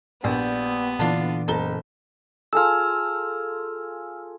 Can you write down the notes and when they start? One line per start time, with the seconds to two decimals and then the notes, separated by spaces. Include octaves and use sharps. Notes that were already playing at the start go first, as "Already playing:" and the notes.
0.24 A#1 G3 B3
0.99 A#2 D3 E3 D4 F4 A5
1.48 F#1 A4 A#5 G7
2.53 F4 G#4 A4 E6 F6